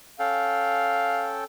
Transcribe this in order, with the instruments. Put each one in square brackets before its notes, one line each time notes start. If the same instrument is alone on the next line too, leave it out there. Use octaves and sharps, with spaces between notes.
[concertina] C#4 A4 G5 [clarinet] F5